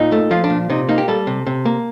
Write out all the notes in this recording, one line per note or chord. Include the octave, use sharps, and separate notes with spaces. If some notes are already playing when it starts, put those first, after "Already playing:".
Already playing: A#2 D#4
A3
F3 F4
D4
A#2
C3 D#4
A#3 D#4
G4
G3 A4
C3
C3
A#3